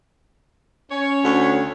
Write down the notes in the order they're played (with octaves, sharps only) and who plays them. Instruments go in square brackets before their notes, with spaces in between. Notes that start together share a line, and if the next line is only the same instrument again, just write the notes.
[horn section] C#4 C#5
[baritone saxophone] D2